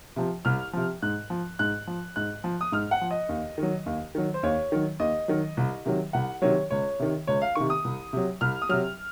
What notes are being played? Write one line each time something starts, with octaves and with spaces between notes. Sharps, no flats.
C3 F3
C2 F6
C3 F3
G#2 F#6
F3
G#2 F#6
F3
G#2 F#6
F3
D#6
G#2 F6
F#5
F3
D#5
D#2
D#3 F#3
D#2
D#3 F#3
C5
D#2 C#5
D#3 F#3
D#2 D#5
D#3 F#3
C2
C3 D#3 F#3
C2 F#5
C3 D#3 F#3 C#5
C#2 C#5
C3 D#3
C#2 C#5
F5
C3 D#3 C#6
D#6
C2
C3 F#3
C2 F6
D#6
C3 F#3 F6